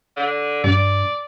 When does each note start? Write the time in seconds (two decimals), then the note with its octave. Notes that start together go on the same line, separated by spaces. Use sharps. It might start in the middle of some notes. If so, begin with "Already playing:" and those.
0.17 D3
0.64 G2 D5